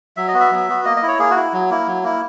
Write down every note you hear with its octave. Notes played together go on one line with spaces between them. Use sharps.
F#3 E5
D#5
B3 F#4
E5
F#3
B3 F#4
A#3 D#5
D#5
E4
C#5
A#3 G#4
F#4
E4
F#3
A#3 E4
F#3
A#3 E4